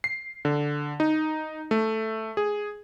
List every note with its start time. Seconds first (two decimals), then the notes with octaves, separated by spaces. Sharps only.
0.04 C7
0.45 D3
1.00 D#4
1.71 A3
2.37 G#4